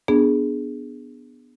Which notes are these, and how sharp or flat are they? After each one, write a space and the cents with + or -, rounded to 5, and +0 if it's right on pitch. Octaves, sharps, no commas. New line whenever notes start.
B3 +0 D4 +5 G#4 +0